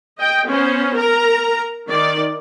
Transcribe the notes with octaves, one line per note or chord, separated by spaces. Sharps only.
D#5 G5
B3 C#4 C5
A#4 A#5
D#3 D5